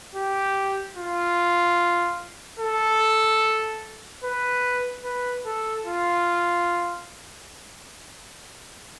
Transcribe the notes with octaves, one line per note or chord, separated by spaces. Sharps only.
G4
F4
A4
B4
B4
A4
F4